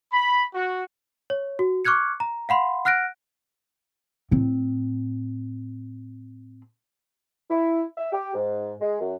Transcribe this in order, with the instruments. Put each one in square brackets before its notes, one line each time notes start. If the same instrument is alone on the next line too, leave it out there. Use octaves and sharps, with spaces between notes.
[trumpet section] B5
F#4
[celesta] C#5
F#4
C#6 D6 F6 F#6 G#6 C#7
A#5
F5 F#5 B5 C6
F#5 F6 F#6 A#6 D7
[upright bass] A2 C4
[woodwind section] E4
E5
G4
G#2
G#3
F#2